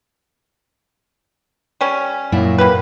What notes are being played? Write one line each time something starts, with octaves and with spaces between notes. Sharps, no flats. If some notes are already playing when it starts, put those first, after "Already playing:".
G3 C#4
F#2 A#2 E4
A#3 G4 B4